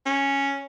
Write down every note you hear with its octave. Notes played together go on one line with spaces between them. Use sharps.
C#4